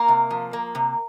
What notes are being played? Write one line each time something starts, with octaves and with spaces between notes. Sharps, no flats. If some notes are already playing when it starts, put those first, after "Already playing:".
Already playing: A#3 A#4
C3
F3
A#3
C3